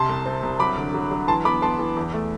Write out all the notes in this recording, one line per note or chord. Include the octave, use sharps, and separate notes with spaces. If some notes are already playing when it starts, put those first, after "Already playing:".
Already playing: C3 A5 C6
C2
C4
C2
F#3 B5 D6
D3
F#3
F#3
E3 A5 C6
B3 B5 D6
B3 A5 C6
E3
E2
A3